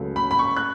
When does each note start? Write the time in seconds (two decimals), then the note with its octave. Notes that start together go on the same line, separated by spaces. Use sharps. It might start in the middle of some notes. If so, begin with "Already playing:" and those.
Already playing: C#2 C#3 F#3 A3
0.16 B5
0.31 B5
0.39 C#6
0.56 F#6